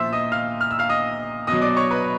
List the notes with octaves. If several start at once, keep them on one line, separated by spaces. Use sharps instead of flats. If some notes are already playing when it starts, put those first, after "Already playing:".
Already playing: A#2 F3 C5 E5 C6 E6
D#5 D#6
F5 F6
F6
E6
F5 F6
D#5 D#6
B2 F#3 D#5 D#6
D5 D6
C#5 C#6
B4 B5